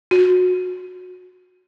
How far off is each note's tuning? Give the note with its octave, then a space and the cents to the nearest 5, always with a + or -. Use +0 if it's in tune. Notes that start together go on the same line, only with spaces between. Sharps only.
F#4 -25